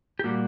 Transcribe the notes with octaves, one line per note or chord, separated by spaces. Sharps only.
G4
A#2 G3 A#3 F#4